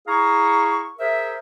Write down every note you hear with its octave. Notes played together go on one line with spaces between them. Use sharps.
E4 G#4 F5 A#5 C#6
G#4 A#4 C5 E5